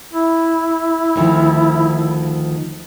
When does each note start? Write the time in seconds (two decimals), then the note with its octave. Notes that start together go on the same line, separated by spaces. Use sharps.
0.14 E4
1.16 D2 D#3 F3